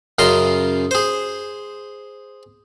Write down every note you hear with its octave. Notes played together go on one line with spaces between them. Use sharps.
F#2 C#3 F4 D#5 C6
G#4 C5